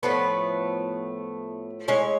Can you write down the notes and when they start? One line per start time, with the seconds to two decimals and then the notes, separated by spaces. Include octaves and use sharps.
0.03 A2 F3 A3 B3 B4
1.88 A2 G#3 C#4 C#5